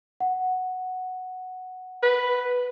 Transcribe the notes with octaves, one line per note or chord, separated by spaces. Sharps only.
F#5
B4